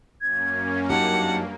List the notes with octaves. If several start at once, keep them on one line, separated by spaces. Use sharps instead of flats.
F#2 A#3 C#4 G#6
G2 F#3 A#3 D#4 G4 F#5 A5